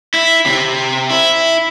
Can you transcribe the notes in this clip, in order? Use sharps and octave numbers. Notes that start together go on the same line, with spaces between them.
E4
C3
E4